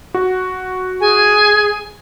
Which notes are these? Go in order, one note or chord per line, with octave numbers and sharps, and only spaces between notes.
F#4
G#4 G#5